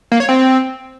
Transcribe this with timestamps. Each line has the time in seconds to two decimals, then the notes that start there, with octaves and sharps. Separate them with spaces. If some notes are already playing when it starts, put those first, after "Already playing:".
0.12 A#3
0.20 C#5
0.29 C4